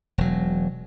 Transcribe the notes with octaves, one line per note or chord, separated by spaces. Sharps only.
E1 F#3